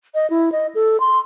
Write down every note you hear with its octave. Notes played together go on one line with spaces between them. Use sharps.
D#5
E4
D#5
A4
C6